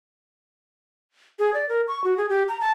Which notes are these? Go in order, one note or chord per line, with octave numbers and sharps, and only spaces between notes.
G#4
D5
A#4
C#6
F#4
G#4
G4
A#5
A5